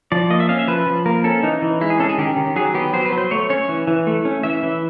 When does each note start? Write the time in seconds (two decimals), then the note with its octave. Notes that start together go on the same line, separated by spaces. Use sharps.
0.12 F3 D5
0.30 A#3 D#5
0.40 E5
0.49 C#4 F5
0.59 E5
0.68 F3 B4
0.87 F3
1.06 A#3 A#4
1.24 C#4 A4
1.43 E3 D#4
1.62 E3
1.81 G#3 E4
1.90 G#4
1.99 C#4 A4
2.09 G#4
2.18 D#3 G4
2.37 D#3
2.56 F#3 G#4
2.74 B3 G4
2.93 F#3 C5
3.06 B4
3.12 F#3
3.18 C5
3.31 A3 C#5
3.50 C#4 C#5
3.69 E3
3.87 E3
4.07 A3
4.25 C#4
4.43 E3 E5
4.63 E3